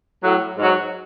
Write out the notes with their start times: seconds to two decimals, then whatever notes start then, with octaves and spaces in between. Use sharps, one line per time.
0.23 A2 F#3
0.58 G#2 F#3